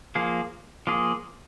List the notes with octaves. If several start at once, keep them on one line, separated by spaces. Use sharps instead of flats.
F3 A#3 G#4
F3 A#3 G#4